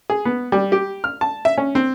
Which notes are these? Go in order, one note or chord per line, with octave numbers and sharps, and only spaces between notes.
G#4
B3
G3
G4
F6
A5
E5
C#4
C4